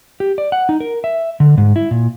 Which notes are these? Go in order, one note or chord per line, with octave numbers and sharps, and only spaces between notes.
G4
D5
F#5
D#4
A#4
E5
D3
G#2
E4
A#2